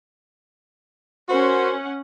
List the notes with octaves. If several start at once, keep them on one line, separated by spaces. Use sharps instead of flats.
C#4 F#4 A#4 C5 F#5